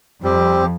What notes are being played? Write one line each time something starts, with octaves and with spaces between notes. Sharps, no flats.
F2 G3 C4 G4